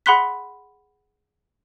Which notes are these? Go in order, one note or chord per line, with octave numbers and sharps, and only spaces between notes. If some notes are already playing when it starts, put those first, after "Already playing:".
G#4 F#5 B5 C6 F#6 B6